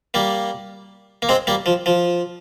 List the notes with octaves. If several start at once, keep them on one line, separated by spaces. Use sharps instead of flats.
G3 A#3
A#3
G#3 C4
G3 A#3
F3
F3